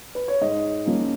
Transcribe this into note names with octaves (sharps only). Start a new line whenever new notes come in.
B4
C#5
G#2 D#5
F3 A#3 C#4